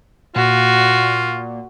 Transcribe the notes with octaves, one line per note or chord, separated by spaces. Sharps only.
A#2 F4 F#4